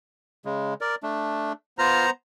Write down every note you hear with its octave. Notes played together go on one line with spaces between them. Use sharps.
C#3 G#3
A#4 D5
A3 D4
B3 F4 C5 A#5 F6